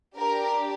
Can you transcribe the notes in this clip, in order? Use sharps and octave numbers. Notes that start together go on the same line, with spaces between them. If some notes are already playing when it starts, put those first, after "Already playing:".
D4 G4 A#4